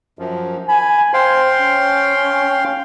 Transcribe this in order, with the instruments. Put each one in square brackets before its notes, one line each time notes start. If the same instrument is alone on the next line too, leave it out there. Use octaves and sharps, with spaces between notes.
[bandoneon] F#2 F3
[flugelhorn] G#5 [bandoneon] B5
[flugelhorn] C5 [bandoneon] F5 G5 C6
[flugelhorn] C#4